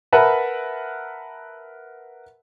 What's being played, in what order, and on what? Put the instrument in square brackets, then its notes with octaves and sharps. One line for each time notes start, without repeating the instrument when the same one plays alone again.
[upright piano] A#4 B4 E5 F#5 A5